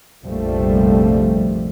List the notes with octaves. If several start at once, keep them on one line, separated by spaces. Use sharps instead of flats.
F1 A#1 F3 G3 A3